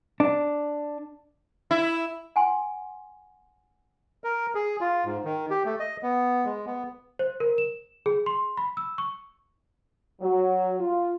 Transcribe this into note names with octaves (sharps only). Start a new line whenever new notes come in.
D4
E4
F#5 G#5 C6
A#4
G#4
F4
G#2
D#3
G4
A3
D#5
B3
G#3
B3
C5
A#4
E7
G#4
C6
B5
E6
C#6
F#3
F4